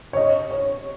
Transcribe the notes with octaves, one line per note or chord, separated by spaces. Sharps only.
C#5
D#5
C#5